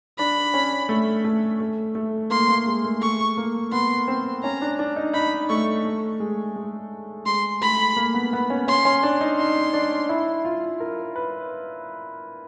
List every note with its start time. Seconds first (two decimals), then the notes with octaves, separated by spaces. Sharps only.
0.18 D4 B5
0.54 C#4
0.89 A3
1.24 A3
1.60 A3
1.95 A3
2.30 A#3 C6
2.49 A#3
2.66 G#3
2.84 A3
3.02 A3 C#6
3.37 A#3
3.72 B3 C6
4.08 C4
4.43 C#4 A#5
4.62 D4
4.79 D4
4.96 D#4
5.13 D#4 B5
5.49 A3 C#6
5.85 A3
6.20 G#3
6.56 G#3
7.26 G#3 C6
7.62 A3 B5
7.96 A#3
8.14 B3
8.33 B3
8.50 C#4
8.68 C#4 C6
8.85 C#4
9.03 D4
9.21 D#4
9.38 D#4 C6
9.73 D4
10.09 E4
10.45 F4
10.80 A#4
11.16 B4